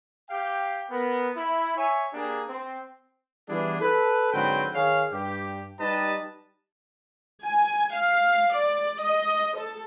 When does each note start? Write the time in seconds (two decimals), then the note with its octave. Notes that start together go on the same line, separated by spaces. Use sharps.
0.30 G4 F5 G5
0.90 B3 A#4
1.35 E4 B5
1.76 C#5 E5 G#5
2.13 A#3 D4 G4 G#4
2.48 C4
3.49 E3 G3 B3 D4 E4 G#4
3.81 A4 B4
4.33 G#2 D3 F#3 C4 B4 G5
4.75 D#3 G#4 C#5 F5
5.12 G2 G4
5.80 G3 D#4 G4 B4 D#5 A5
7.41 G#5
7.95 F5
8.54 D5
9.01 D#5
9.55 A4